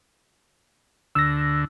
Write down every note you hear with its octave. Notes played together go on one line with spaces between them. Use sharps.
D2 D3 E6 A#6